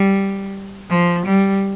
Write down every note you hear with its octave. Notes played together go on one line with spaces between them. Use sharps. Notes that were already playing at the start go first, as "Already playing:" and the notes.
Already playing: G3
F3
G3